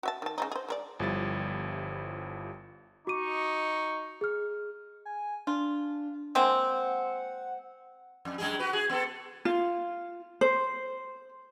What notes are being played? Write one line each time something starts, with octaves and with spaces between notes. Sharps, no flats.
F#4 E5 A5
D#3 A5
C#3 G#3 D#4
G#4 C5
G#3 A#4 D5
G1 F3 G3 E4 A6
D#4 F#4 D#5 C#6 D6 D#7
G#4 F6
G#5
D4 F4
G#3 A#3 C4 F#5
F2
F#2 G#3 G#4
F#4 B4
G#4
B3 A4
F4
C5